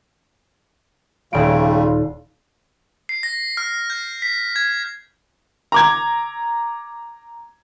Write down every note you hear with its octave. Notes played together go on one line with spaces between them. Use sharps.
D#1 C#3 G3 A3 F4 D7
C7
A#6
F6
G6
B6
G#6
A#5 D6 G#6